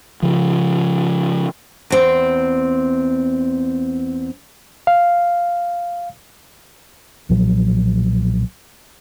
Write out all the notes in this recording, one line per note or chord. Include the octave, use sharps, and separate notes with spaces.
C#3 F3
E2 C4
F5
B1 A#2 F3 F#3